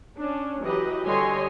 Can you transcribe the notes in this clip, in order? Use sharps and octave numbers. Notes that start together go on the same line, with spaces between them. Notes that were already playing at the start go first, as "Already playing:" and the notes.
C#4 D4
E3 F#3 G4 B4 D#5
D3 G3 C#5 D#5 G#5 C6